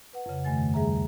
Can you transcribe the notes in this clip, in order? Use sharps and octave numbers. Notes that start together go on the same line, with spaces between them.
B4 F#5
F2 C#3
G2 D#3 A3 G#5 A6
D2 G3 G#4 E5 A#5